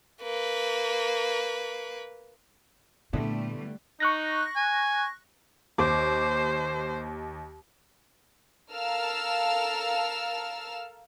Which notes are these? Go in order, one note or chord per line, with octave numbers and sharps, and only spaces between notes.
A#3 B4
G2 A#2 D3 G3 A3 B3 E4
D#4 C#6 F#6 A#6
G#5
D#2 C5 D6
A4 A#4 F5 A5 E6 F6